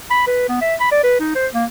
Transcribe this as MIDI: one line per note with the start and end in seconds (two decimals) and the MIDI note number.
0.10 0.24 83
0.27 0.48 71
0.49 0.59 59
0.61 0.75 76
0.80 0.90 83
0.92 1.02 74
1.04 1.18 71
1.20 1.34 63
1.35 1.47 72
1.54 1.65 58